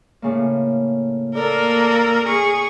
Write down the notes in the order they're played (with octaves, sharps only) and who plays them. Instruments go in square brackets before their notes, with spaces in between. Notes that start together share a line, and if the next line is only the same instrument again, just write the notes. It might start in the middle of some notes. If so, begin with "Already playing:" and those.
[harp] A2 C#3 A#3
[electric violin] A#3 A#4 [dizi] A4 [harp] D5
[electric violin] G#4 C#6